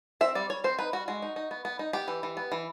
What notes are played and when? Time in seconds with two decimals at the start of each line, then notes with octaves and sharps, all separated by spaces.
0.21 C4 E5
0.35 G3 D5
0.49 G3 C#5
0.64 C4 C5
0.79 D#4 B4
0.93 G3 F#4
1.08 G#3 F#4
1.22 D#4
1.36 D#4
1.51 B3
1.65 B3
1.79 D#4
1.93 B3 G4
2.08 E3
2.23 E3
2.37 B3
2.52 E3